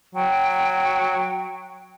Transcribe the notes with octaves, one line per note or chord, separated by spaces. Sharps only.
F#3 G5